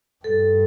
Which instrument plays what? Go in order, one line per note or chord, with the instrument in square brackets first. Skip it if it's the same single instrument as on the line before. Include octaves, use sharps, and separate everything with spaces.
[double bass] G2 [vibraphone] A4